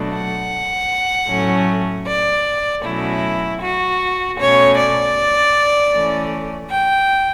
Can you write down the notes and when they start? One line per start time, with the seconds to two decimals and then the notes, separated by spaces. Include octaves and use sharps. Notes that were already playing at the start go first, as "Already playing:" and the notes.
Already playing: B2 F#3 A3 D4
0.12 F#5
1.28 A2 F#3 A3 C#4
2.05 D5
2.83 B2 F#3 A3 C#4 E4
3.60 F#4
4.38 B2 A3 C#4 C#5
4.76 D5
5.92 E3 A3 C#4
6.70 G5